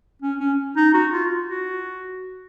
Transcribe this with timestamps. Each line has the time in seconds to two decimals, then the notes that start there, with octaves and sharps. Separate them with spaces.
0.22 C#4
0.40 C#4
0.76 D#4
0.94 F#4
1.12 F4
1.48 F#4